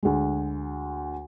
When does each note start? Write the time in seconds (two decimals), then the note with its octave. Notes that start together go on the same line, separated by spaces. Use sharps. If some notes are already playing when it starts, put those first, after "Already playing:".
0.03 D2 G#3